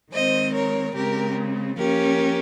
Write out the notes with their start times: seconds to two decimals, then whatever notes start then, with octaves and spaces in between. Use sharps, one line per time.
0.12 D#3 G#3 C4 C5 D#5
0.54 A#4 C#5
0.94 C#3 G#3 C4 G4 A#4
1.76 F3 A#3 C#4 G4 A#4